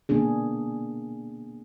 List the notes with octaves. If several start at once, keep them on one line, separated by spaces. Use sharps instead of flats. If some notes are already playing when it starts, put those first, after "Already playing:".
A#3 B3 D4 G#4